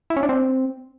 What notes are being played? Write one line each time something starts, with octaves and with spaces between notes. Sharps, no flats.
E4
C#4
D4
C4